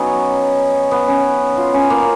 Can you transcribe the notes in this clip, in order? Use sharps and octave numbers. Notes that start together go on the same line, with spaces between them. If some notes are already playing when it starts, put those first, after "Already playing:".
Already playing: F#3 B3 C#4 D#4
B3
C#4
F4
C#4
A#3